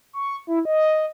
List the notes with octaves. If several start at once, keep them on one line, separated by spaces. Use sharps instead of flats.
C#6
E4
D#5